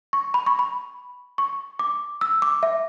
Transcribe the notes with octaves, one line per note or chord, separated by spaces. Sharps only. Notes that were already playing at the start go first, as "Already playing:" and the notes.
C#6
B5
C#6
B5
C#6
D6
E6
D6
E5